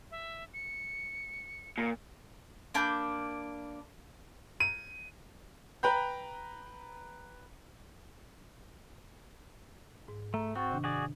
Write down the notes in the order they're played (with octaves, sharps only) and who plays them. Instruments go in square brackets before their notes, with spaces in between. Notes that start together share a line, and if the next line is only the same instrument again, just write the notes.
[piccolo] E5
C#7
[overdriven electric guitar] A#2
[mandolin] A#3 D4 B5 G6
[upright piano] D#7
[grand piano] B4 G5 A#5 B5 G6
[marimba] G#2
[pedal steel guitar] A3 [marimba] A#5
[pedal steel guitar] C4 F#4 [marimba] C#6 A6
[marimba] C3 D#3 D4
[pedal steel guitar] F#4 G#4 D5